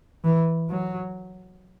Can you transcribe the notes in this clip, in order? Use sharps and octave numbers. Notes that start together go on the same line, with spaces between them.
E3
F#3